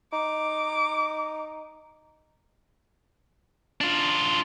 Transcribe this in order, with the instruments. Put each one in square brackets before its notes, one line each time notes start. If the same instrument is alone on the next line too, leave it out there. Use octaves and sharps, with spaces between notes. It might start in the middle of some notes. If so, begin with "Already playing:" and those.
[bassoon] D#4 [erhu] D6
[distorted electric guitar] D4 F4